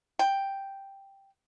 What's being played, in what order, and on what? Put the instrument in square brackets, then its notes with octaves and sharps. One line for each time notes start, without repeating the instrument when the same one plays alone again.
[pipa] G5